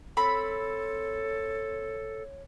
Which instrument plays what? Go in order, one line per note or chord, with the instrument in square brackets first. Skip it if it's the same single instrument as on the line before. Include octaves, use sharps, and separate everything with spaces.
[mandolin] C4 B5 [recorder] A4 [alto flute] C#5